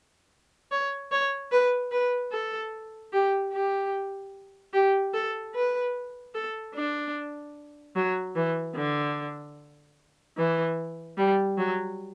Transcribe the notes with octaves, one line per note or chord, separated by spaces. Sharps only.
C#5
C#5
B4
B4
A4
G4
G4
G4
A4
B4
A4
D4
F#3
E3
D3
E3
G3
F#3